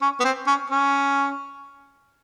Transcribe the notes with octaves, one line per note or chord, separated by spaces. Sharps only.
C#4
B3
C4
C#4
C#4